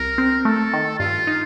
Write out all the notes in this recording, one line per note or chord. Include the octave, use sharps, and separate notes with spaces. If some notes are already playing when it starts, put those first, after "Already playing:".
Already playing: C2 A#4
C4
A3 A4
D#3
G2 F4
D#4